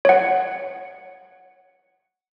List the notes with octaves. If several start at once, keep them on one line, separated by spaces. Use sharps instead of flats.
C#5 F#5